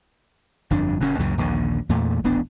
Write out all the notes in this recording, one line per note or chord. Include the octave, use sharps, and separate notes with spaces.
G1 F2 D4
F#1 F#2 A#2 C#4
C#2 F#2 A#2 C#3
A#1 D#2 D3
E2 A#2 A3
D#1 A1 B3 D4